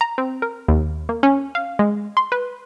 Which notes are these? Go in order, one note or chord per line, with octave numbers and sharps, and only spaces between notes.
A#5
C4
A#4
D#2
A#3
C#4
F5
G#3
C6
B4